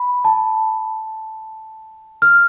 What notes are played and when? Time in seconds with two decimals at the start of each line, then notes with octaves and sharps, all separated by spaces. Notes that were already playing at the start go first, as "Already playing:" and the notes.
Already playing: B5
0.25 A5
2.22 F6